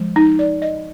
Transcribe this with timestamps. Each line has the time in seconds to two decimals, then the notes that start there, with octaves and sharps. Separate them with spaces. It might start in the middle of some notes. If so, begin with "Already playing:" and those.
Already playing: F3 G#3
0.16 D#4
0.39 D5
0.62 D#5